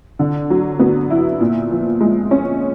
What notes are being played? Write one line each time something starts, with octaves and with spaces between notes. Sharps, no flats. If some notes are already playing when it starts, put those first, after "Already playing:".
D3
F#3
B3
E4
A#2
F3
G#3
C#4